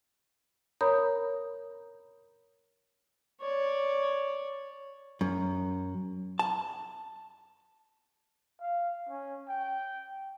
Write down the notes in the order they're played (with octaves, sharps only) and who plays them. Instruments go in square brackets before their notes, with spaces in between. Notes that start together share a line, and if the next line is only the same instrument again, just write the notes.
[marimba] A#4 C#5 A#5 B5 D#6 G6
[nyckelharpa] C#5 D5
[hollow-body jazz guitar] F#2
A5
[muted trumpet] F5
C#4
G5